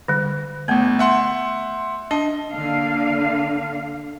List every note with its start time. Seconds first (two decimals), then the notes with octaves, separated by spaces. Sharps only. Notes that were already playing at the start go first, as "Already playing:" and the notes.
0.08 D3 G3
0.68 G1 A3 B3 G6
0.99 E5 F#5 C6
2.11 D4 D#5 A5
2.53 D3 A#3 D4 F5